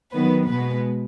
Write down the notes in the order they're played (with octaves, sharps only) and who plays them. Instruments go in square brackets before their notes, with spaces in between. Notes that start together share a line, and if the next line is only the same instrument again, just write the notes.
[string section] D#3 F#3 B3 B4
B2 G#3 B3 B4